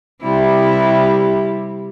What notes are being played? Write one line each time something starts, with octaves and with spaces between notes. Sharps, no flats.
C3 G3 E4